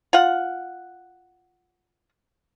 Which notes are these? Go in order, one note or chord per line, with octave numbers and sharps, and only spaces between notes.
F4 F#5